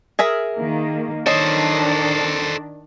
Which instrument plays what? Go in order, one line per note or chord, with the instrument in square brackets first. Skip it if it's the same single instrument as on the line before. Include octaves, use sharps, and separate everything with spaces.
[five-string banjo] G#4 A#4 E5
[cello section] D#3 A#3
[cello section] D#3 D4 [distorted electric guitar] A4 C5 [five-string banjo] C#5 D#5